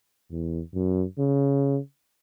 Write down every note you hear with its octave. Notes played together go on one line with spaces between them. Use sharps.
E2
F#2
C#3